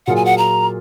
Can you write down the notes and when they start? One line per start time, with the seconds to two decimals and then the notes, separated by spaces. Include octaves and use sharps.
0.07 A#2 F#3 A#3 F4 G#4 F#5
0.16 G#5
0.25 F#5
0.38 A#5